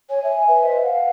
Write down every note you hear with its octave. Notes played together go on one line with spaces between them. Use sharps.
C#5 G#5
E5
B4
C5 D#5 E5
F5 F#5